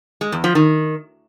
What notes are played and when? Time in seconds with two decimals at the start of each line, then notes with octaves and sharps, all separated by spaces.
0.21 G#3
0.32 E2
0.44 F3
0.55 D#3